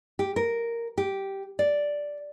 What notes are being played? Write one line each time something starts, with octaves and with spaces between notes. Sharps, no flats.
G4
A#4
G4
D5